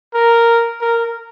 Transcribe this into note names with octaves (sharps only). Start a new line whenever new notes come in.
A#4
A#4